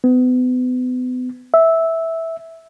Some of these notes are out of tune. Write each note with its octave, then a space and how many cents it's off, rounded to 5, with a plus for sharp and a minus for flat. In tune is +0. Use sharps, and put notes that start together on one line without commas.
B3 +35
E5 -10